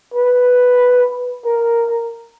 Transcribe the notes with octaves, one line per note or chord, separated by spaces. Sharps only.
B4
A#4